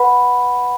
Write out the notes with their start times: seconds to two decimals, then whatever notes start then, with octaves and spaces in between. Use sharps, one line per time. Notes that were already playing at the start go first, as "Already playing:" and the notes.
Already playing: B4 F#5 B5